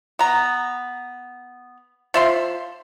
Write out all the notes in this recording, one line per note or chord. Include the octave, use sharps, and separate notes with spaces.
B3 A#5
F3 E5 C6